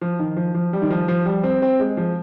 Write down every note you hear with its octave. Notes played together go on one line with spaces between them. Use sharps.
F3
D#3
F3
F3
G3
D#3
F3
F3
G3
C4
C4
G#3
F3